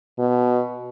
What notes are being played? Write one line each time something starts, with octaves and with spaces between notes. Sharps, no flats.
B2